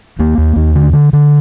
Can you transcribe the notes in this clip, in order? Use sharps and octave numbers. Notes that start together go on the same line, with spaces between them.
D#2 A#3
D#2
D#2
D3
D3
D3